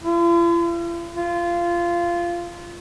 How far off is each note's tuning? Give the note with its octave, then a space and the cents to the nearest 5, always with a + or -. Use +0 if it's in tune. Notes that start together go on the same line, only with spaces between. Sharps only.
F4 -45
F4 -15